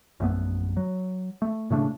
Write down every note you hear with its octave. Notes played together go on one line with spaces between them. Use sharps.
A#1 F#2 A3 B3
F#3
A3
A2 C#3 A3 D4